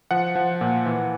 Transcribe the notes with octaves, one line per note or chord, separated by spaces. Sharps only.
F3 F#5
F3
A#2
E3